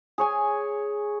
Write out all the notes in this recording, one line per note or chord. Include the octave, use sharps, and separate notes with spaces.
G#4 C#5 G#5